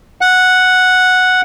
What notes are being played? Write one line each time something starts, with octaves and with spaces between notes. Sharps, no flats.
F#5